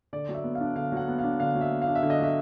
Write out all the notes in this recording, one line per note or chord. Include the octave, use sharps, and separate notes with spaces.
D3 D5
F#3
E5
B3
F5
D4
D3 F5
F#3 F#5
B3
F5
D4
D3 F5
F#3
E5
B3
F5
D4
E5
D3
D#5
F#3 E5